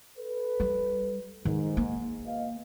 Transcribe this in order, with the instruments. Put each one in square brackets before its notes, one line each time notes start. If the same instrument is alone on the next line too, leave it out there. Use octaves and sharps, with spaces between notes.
[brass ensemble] A4 B4
[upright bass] G3
[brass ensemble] G#2 [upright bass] D#3
[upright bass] A#3
[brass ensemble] B2 D#5 F5